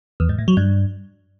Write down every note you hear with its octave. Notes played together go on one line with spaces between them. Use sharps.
E2
G#2
A2
F#3
G2